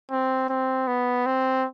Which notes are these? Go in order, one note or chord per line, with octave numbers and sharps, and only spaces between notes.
C4
C4
B3
C4